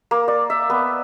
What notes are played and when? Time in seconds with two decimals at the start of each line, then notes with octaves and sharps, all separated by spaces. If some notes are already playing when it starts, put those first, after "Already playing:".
0.11 A#3
0.28 D5
0.50 E5
0.70 B3